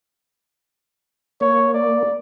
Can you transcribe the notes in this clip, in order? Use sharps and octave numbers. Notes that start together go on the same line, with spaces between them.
A#3 C#5
D5